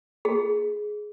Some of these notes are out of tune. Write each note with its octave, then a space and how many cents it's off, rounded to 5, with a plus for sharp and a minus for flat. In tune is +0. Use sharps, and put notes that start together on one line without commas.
G#4 +10